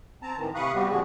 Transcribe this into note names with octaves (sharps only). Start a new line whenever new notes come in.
C4 A5 A#5
A2 D#3 E3
C3 F5 B5 C#6 D#6 F#6
G3 B3 C4 F#4 G4
A#2 D3 F3 G#3 F#4 G#4